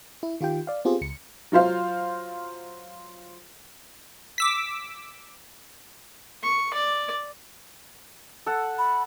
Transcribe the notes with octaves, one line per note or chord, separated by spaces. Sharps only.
E4
D#3 F4 G4 G5
D5 F5
B3 C4 F4 G4 G#4 C5
C#2 C#7
F#3 F4 C5 F5
D6 E6 B6
C#6
D5
A4 F#5
B5